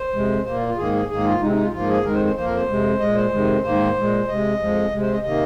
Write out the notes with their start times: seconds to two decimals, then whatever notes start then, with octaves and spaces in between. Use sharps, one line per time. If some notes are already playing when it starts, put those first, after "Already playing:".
Already playing: C5
0.13 F2 C3 G#3
0.44 A#2 A#3 C5
0.55 F4
0.66 F4
0.76 G#2 D#3 A#3 G#4
0.92 G#4
1.08 G#2 D#3 A#3 G#4
1.24 F4
1.40 C3 G#3 D#4
1.46 C4
1.51 D#4
1.61 F4
1.72 G#2 F3 A#3 F4
1.88 G#4
2.04 F2 D#3 G#3 A#4
2.14 C5
2.25 C5
2.36 F2 F3 A#3 C5
2.45 A#4
2.55 C5
2.67 F2 C3 G#3
2.99 A#2 G#3 D#5
3.15 C5
3.31 F2 C3 D#3 G#3
3.63 G#2 D#3 A#3 C5
3.95 A#2 G#3
4.27 C3 G#3 D#5
4.59 F2 F3 G#3
4.91 C3 G#3
5.01 C5
5.12 D#5
5.23 C3 D#3 A#3 D#5